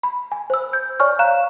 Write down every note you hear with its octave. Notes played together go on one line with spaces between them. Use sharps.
B5
G#5
C5 E6
G6
C#5 D5 G#5 C#6 F6
F5 A#5 F#6 E7